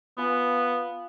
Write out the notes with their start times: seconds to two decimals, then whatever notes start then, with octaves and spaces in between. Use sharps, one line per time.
0.18 B3 F4 G#5